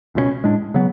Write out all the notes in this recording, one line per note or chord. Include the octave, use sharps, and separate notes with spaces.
C#2 B2 A3 C#4
A2 G#3 D4
C#3 F#3 B3